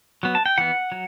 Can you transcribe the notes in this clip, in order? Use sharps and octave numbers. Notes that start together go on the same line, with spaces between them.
F#3 B3
A5
G5
E3 B3 F#5
F#3